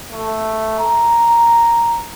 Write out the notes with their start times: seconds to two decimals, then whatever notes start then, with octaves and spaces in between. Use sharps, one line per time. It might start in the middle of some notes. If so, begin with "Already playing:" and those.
0.12 A3
0.80 A#5